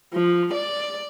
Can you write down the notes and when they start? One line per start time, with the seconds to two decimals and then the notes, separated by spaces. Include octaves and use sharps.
0.14 F3
0.54 D5